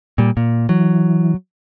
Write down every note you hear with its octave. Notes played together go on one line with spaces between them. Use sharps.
A#2 G3
A#2
E3 F#3